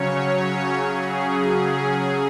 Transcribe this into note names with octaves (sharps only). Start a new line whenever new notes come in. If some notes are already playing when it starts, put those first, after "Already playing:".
Already playing: C#3 F#3 C#4 C#5
G#4